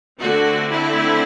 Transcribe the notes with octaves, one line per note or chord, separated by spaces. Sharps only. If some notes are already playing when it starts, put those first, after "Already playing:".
D3 A3 C4 F#4
E4